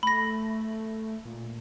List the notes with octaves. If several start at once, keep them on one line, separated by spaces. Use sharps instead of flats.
A3 B5 A#6
A#2